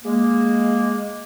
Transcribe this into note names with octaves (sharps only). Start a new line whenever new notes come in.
G#3 A#3